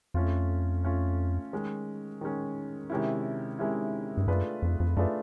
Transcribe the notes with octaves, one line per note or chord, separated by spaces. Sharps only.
F2 A3 C#4 F4
A3 C#4 F4
D#3 G#3 C#4
D#3 G#3 C#4
C3 D#3 G#3 C#4 E4
C3 D#3 G#3 C#4 E4
G2
F#2 A3 D4 F4 G#4 B4
F2
F2
F#2 A3 D4 F4 G#4 B4